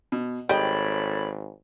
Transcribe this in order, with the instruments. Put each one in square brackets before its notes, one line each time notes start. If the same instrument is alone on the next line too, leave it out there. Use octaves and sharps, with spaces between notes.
[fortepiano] B2
[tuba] G#1 [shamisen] G3 D#5 [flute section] A4 C#5 B5 [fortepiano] G5